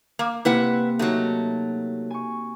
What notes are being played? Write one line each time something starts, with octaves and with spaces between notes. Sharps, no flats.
A#3
C3 A#3 E4 B4 F#5
F#3 A3 D#4 F#4
G#5 C#6